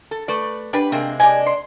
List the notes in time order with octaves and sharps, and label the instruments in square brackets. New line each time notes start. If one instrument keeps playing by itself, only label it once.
[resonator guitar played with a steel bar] A4
A3 B4 D5
[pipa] D4 [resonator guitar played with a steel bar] G4 B4 [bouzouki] F#5
[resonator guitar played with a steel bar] C3 G#3 A#3 [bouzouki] C4
[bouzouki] D4 D#5 [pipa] G4 G#5
[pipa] C6